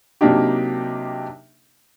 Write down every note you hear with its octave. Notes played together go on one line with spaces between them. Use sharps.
C3 F#3 A#3 D4 D#4 G4